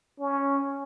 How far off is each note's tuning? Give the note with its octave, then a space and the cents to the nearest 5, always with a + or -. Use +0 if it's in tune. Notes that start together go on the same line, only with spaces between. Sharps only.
C#4 +0